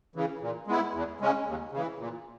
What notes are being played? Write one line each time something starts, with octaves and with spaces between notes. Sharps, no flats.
C#3 E3
A#2
G#3 B3 E4
E2
C#3 G#3 C#4
D#2
C#3 E3
A#2